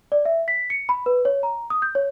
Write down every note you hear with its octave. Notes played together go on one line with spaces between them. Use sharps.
D5
E5
B6
C#7
B5
B4
C#5
A#5
D#6
G6
C#5